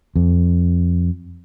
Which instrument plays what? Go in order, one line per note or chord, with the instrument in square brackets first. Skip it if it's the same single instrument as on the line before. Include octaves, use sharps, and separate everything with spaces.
[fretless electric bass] F2